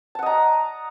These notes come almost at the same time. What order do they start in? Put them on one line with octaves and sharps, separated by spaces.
A5 F#5 D#5 A#5